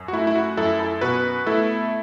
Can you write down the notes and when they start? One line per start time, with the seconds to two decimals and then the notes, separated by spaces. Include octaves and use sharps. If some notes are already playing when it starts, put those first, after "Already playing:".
Already playing: F#2
0.08 F#4
0.13 A3 E4
0.27 E4
0.35 F#4
0.57 F#2 E4 A4
0.79 E4 A4
1.01 B2 F#4 B4
1.46 A3 E4 A4